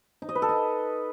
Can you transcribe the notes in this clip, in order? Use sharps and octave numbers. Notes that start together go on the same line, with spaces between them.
D#4
D#5
B4
A4
D#5